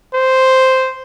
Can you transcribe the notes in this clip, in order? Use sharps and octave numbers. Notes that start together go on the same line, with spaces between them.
C5